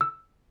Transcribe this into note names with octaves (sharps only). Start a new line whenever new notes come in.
E6